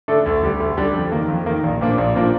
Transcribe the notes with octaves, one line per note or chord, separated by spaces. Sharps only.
D3 A3 D4 A4
D2
D3 G3 D4 G4
D2
D3 G3 D4 G4
F2
D#3 A#3
F2
D#3 A#3
A#1
A#2 F3 A#3 D4
A#1
A#2 F3 A#3 D4